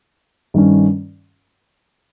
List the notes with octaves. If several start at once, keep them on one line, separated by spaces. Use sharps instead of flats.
G2 D#3 G3 C#4